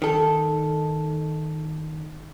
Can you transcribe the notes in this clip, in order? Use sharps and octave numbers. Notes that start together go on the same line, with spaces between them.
D#3 A4